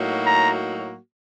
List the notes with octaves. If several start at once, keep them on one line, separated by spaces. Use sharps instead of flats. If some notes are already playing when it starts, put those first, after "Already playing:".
Already playing: A2 F#3 A#3 D#4 F#4
A#5